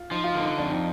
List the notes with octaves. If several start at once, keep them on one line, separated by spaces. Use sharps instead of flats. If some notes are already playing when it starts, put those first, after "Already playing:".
Already playing: F4
F3 D#4
F4
D3 D#4
F2 D4
D#4